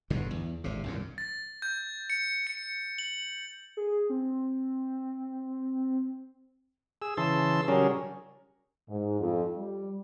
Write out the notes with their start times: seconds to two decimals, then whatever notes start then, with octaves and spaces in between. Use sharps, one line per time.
0.10 G1 G2 B2 D3
0.31 E2
0.64 G#1 C3
0.84 C2 F#2 A#2
1.18 A6
1.62 G6
2.10 C#7
2.47 C#7
2.98 F#7
3.77 G#4
4.10 C4
7.02 G#4 E6
7.17 C#3 E3 A5 C6 E6
7.68 C#3 F#3 G3 C#4 G#4 A#4
8.89 G#2
9.20 F2
9.57 G3